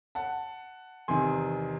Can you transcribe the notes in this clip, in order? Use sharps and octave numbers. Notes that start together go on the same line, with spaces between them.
F#5 A5
E2 C3 D#3 G#5 C6